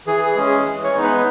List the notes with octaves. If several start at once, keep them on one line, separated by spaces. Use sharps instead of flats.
E3 G#4
G#4
G#3 C#4
G#4
E3
C#5
G#3 B3 D#4
B4